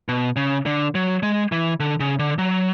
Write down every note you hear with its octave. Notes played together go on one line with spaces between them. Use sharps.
B2
C#3
D3
F#3
G#3
E3
D3
C#3
D3
F#3